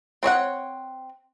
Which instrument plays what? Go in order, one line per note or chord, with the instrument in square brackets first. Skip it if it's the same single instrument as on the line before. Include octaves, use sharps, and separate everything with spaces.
[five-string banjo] C4 C#5 D#5 F#5